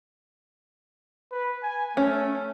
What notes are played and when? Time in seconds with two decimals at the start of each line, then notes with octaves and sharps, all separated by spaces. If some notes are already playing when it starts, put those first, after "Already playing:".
1.32 B4
1.63 G#5
1.97 A3 C#4